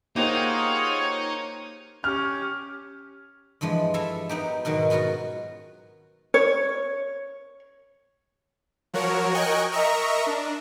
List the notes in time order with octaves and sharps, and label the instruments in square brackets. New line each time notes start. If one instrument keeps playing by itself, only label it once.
[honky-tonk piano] A#3 G4 C5 [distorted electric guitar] D#4 [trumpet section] F4 G#4 F#5 [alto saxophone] C#5
[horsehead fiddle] C#4 G4 [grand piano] F6
[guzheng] G2 E3 F3 G#3
E4 F4 A4 E5 F5
F#3 B3 D#4 G4
G#2 B2 D#3 F#3
B3 C#4 F4 F#4 A#5
[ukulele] C#5
[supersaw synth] F3 F#3 F#4 A#4 C#5
A#4 D#5 G5 G#5 C#6 F#6
A#4 D#5 E5 A#5 C#6
D4